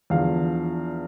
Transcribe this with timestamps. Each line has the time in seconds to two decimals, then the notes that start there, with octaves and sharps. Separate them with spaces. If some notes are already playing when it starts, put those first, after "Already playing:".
0.10 E2 D3 F3 F5